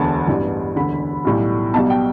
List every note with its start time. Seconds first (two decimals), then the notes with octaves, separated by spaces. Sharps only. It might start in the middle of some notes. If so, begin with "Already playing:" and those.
Already playing: E1 D2 D3 B3 A5
0.27 A1 G2 E3 G3 B3
0.76 E1 D2 D3 B5
1.25 B1 A2 G3
1.74 B1 B2 G3 A5
1.90 G5